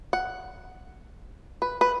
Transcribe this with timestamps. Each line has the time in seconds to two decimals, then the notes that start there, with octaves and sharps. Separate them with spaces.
0.13 F#5
1.62 B4
1.81 B4